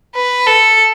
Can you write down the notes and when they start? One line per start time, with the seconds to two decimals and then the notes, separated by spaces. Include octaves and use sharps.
0.15 B4
0.47 A4